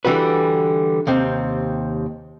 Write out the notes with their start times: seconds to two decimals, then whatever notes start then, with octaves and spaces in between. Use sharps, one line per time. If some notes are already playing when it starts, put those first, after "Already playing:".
0.05 D3 E3 G3 F#4 B4
1.07 D#2 C3 C4